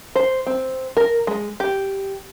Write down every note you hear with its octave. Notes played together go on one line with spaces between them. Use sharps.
C5
C4
A#4
G#3
G4